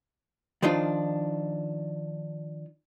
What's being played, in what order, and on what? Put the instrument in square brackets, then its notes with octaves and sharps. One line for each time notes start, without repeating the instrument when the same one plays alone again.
[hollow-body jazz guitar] D#3 F3 D4 D#4 F4